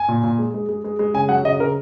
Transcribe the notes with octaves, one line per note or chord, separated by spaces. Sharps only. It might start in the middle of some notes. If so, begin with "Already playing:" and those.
Already playing: G#5
A#2
A#2
G#3
G#3
G#3
G#3
G#3
C#3 G#5
F#3 F#5
C#3 D#5
C#3 A#4